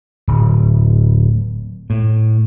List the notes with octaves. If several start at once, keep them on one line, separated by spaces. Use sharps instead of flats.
D1
A2